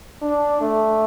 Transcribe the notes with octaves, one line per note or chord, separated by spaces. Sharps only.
D4
A3